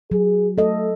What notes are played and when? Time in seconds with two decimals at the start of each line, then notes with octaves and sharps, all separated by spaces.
0.11 F#3 G#4
0.58 A3 A4 D#5